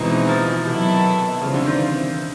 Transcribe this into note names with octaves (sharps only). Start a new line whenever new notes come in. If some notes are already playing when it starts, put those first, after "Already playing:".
Already playing: B2 E3 G#3 C4 D#4
D#3
F3
C3 D#3 F#3 B3 E4 A4
C#3 E3 G3 C4 F4
D3
D#3